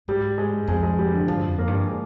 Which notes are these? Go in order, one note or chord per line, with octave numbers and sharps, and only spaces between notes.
G#2 G3
G#3
F2 G#3
G#3
G3
D3
G2 F3
F2
A#3
G2
G#3